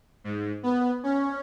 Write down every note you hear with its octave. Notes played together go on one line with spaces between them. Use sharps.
G#2
B3
C#4